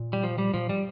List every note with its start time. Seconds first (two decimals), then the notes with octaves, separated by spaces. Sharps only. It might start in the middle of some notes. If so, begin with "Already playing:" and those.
Already playing: A#2
0.13 G3
0.24 F3
0.38 G3
0.54 A#2 F3
0.69 G3